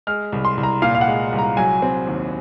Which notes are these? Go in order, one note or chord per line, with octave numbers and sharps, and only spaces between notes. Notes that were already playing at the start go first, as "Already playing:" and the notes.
G#3 F6
C2
C6
C2
A#5
A#2 F5
F5
F#5
G#3
C2
A#5
F#3 G#5
C4
D#2